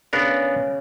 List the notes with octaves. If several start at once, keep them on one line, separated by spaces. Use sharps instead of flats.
C#3 B3 D4 A#4